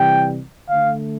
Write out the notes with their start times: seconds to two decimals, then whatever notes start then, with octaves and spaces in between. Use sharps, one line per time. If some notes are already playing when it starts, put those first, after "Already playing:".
Already playing: C3 E3 G3 G5
0.69 D3 A3 F5